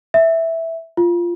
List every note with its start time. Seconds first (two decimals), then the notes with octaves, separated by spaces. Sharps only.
0.14 E5
0.97 F4